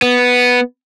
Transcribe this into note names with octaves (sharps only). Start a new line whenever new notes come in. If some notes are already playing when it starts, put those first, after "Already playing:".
B3